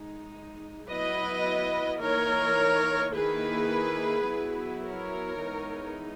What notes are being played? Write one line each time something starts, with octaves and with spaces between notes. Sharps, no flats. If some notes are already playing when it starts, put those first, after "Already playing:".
Already playing: G#3 D#4
F#3 B3 E4 B4 D#5
E3 A#3 D#4 A#4 C#5
D#3 A#3 E4 G#4 B4
F#3 B3 E4
A#4 C#5
E3 G#3 B3 D#4